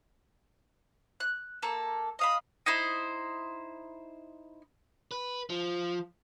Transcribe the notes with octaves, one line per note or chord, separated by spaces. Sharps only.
F#6
A#3 A4
D#5 F5 B5 D#6
D#4 E4 C5
B4
F3